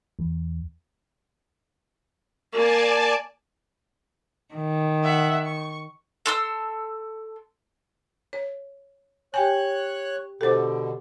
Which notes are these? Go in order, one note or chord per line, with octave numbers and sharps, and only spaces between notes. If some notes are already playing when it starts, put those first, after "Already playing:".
E2
A#3 D5 G#5 A5
D#3
E5 F#5
C#6
A4 C6 E6
C#5
G4 C#5 G5 G#5 F#6 G6
B2 D3 G4 A4 C5 D6